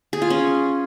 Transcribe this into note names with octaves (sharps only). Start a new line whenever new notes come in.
G#4
F4
C#4